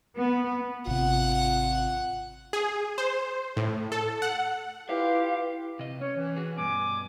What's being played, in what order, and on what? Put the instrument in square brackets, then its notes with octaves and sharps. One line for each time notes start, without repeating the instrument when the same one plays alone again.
[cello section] B3
[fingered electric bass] G#1 C3 [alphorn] F4 [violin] F#5
[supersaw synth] G#4
C5
A2
A4
F#5
[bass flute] E4 [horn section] F4 G4 [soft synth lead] B4 [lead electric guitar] F5
[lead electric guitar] C3 D#5
[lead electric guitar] C#4 [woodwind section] C#5
[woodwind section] E3
[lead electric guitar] F#4 G#4
[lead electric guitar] G2 B2 [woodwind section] G#5 D6